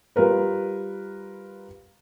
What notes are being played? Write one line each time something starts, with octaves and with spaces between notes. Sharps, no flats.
G3 F4 A#4 B4